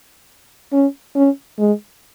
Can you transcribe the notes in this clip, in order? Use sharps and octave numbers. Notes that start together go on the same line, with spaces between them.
C#4
C#4
G#3